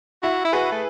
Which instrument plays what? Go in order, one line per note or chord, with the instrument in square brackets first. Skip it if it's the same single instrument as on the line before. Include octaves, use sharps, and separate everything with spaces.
[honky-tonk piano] E4 [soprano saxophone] F#4
[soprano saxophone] E4
[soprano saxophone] F#4 [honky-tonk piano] G#4 B4
[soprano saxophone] A3